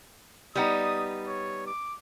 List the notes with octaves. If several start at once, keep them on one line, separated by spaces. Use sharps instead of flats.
G3 B3 D#4 D#6
C#5
D6